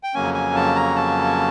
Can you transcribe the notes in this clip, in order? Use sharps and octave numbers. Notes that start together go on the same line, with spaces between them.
G5
F2 C#3 F#3 A#3 C#4 G#5
G#5
A5
A#5
A5